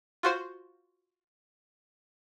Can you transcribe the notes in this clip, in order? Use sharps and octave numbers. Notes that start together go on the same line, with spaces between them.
F4 F#4 C5